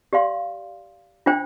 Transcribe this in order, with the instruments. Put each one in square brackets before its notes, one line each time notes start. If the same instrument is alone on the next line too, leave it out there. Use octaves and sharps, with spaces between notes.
[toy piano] G4 D5 F5 C6
D4 F4 C5 G5